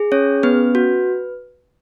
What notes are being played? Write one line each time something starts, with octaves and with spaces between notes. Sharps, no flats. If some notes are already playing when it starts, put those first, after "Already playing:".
Already playing: G#4
C#4 C#5
B3 B4
F#4